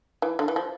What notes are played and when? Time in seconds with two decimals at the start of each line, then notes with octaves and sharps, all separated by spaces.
0.22 E3
0.39 D3
0.48 E3
0.56 F3